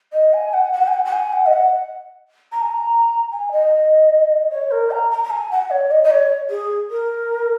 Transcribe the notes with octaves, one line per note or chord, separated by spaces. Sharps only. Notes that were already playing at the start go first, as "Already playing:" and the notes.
D#5
G#5
F#5
F#5
G#5
F#5
F#5
G#5
F#5
D#5
F#5
A#5
G#5
A#5
G#5
D#5
C#5
A#4
A#5
A#5
A#5
G#5
F#5
C#5
D#5
D#5
C#5
G#4
A#4